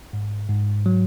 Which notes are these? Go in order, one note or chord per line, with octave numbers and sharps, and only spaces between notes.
G#2
G#2
F#3